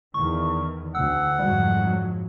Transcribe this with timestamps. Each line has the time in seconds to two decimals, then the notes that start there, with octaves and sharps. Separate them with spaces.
0.14 E2 D#3 C#6
0.95 D2 F#5 E6
1.39 F2 G#2 F#3 G3